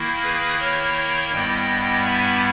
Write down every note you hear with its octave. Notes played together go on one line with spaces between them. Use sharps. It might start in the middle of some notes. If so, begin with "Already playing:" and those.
Already playing: D#3 A#3 E4
G#4 B4
A#4 C#5
G2 G3 B3 E4 D#5 G5
E5 G#5